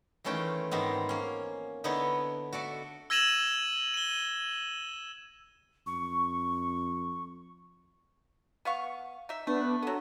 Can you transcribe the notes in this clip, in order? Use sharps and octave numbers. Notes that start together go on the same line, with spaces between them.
D#3 E3 A3 C#4 F4 G5
G#2 D#3 B3 C4
A#3 C#4
D3 B3 D#4 E4 B4 C#5
F#4 A4 D5 E5
E6 G#6 A#6 D#7 E7 F#7
D#7 G7
F2 C#6
B3 F5 C#6
D#4 E5
A3 B3 D4 B4
F#3 B3 A4